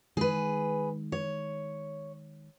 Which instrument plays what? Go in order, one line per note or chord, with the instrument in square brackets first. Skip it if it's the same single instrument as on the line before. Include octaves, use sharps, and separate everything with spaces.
[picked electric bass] D#3 G#3 [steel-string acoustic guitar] G#4 B4
[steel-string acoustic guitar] C#5